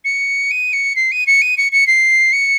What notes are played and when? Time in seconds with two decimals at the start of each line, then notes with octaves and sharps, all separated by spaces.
0.05 C#7
0.51 D#7
0.73 C#7
0.96 C7
1.12 D#7
1.27 C#7
1.42 D#7
1.58 C#7
1.72 C#7
1.87 C7
2.33 C#7